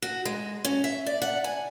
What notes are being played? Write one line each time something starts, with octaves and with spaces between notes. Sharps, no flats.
F#4
G#3
C#4
E5
D5
F#5
G#5